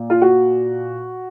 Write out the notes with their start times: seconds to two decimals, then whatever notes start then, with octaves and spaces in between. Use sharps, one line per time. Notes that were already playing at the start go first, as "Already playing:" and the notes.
Already playing: A#2
0.10 F4
0.22 F#4